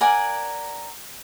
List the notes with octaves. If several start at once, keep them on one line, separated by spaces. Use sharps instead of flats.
A#4 D5 F#5 G#5